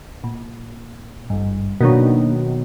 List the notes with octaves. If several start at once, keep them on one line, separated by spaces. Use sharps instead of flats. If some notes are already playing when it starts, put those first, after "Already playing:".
A#2
G#1 G2
B2 D#3 F#3 A#3 D4